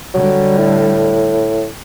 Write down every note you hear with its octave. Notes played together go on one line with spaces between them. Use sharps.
D3 F#3 G3
A2